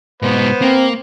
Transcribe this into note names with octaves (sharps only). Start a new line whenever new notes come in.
G#2 B2 B3 C5
A#3 C4